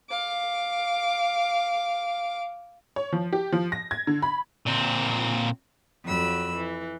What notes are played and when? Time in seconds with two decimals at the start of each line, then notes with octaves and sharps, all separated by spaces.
0.10 F5 D6
2.96 C#5
3.12 F3
3.33 G4
3.52 F3
3.72 A#6
3.91 G#6
4.07 D3
4.22 B5
4.66 A#2 C4
6.04 F2 F#3 B5 E6
6.56 E3